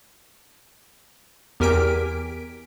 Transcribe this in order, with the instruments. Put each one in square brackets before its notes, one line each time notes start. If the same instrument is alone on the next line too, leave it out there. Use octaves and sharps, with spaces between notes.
[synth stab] E2 G4 A#4 G#5 B6 D7